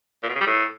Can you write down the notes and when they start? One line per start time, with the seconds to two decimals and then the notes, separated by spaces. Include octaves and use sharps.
0.23 A#2
0.29 B2
0.35 C#3
0.41 G3
0.47 A2